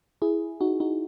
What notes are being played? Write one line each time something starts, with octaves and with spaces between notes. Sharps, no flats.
E4 G#4
D#4 F#4
D#4 F#4